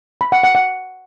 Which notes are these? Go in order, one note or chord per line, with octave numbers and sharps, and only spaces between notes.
B5
F#5
F#5
F#5